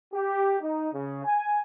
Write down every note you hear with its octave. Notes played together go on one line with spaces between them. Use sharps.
G4
D#4
C#3
G#5